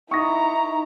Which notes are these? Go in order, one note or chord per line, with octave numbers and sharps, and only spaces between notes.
D#4 E4 A#5 C#6 D#6 A#6